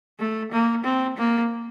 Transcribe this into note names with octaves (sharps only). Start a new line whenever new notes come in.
A3
A#3
C4
A#3